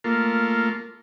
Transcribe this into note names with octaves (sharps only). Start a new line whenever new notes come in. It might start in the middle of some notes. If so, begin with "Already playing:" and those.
A3 A#3 F4